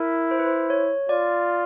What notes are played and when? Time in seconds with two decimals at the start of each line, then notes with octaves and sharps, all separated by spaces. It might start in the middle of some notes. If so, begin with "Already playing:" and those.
Already playing: E4 A#4
0.31 C5
0.39 B4
0.46 C5
0.70 C#5
1.09 F4 D5